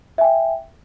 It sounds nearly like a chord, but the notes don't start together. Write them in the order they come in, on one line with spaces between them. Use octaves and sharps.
E5 G#5 G5